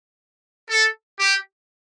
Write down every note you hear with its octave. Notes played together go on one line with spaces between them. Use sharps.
A4
G4